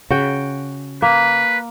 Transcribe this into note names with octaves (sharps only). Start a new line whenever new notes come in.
C#3 F#4 G5
A#3 B4